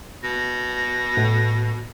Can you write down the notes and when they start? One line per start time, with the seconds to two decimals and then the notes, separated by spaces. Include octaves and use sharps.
0.23 B2 A#6
1.17 A2